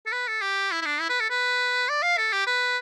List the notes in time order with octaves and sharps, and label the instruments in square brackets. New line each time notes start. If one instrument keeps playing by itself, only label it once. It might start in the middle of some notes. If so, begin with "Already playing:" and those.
[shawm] A4
B4
A4
G4
E4
E4
D4
E4
B4
A4
B4
D5
F5
A4
G4
B4